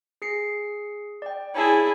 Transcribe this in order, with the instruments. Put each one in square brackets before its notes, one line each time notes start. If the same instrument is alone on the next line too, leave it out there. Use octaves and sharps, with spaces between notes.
[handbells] G#4 C7 C#7
D5 G5
[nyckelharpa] E4 G#4 [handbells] C#5 G#5 A5